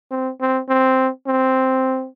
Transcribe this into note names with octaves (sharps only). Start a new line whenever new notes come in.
C4
C4
C4
C4